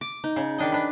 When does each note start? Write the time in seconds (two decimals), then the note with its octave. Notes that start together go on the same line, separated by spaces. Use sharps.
0.01 D6
0.24 D#4
0.36 C#3
0.58 D#3 D4 D#5
0.72 D4 B4